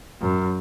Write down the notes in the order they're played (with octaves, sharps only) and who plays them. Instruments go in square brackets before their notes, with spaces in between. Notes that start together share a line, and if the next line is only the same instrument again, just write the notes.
[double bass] F#2